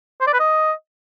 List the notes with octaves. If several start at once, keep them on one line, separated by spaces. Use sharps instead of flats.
C5
D5
B4
D#5